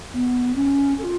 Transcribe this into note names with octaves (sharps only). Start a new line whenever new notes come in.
B3
C#4
A4
F4